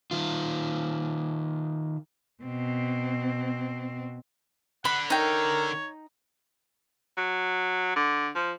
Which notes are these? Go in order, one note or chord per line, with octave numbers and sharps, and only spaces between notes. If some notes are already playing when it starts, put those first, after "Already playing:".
D#3 F4
B2 C4
D3 F#5 B5
D#4 A#4 C#5 G5
F#3
D3
F3